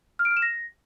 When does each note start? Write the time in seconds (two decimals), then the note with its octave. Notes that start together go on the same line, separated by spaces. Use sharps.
0.19 F6
0.25 D7
0.31 F6
0.37 E7
0.42 A#6